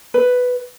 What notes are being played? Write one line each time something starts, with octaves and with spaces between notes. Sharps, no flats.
B4